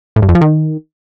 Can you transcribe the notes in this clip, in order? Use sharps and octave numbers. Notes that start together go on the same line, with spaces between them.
A2
G2
F2
F3
D#3